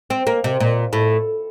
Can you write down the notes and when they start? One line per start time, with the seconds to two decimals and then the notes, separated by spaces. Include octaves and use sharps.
0.10 C4
0.27 A#3
0.44 C3
0.60 A#2
0.93 A2